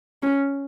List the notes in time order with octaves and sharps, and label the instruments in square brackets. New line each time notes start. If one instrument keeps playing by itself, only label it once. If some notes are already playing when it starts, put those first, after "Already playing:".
[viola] C#4